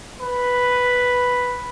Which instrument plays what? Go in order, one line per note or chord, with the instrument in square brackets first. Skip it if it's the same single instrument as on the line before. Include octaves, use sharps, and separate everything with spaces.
[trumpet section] B4